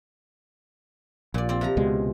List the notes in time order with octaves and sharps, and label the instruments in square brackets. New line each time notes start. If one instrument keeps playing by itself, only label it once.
[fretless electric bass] A#1 [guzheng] A#2 D5
[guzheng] C4 D5
C3 F3 A#5
[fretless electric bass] C#2 B2 G#3